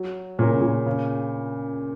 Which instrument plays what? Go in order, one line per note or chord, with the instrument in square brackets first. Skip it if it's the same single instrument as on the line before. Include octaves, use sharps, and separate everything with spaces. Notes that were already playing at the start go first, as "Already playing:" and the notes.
Already playing: [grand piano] F#3
[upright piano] A#2 [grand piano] C#4 A#4
[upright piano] C#3
A#2
[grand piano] C#3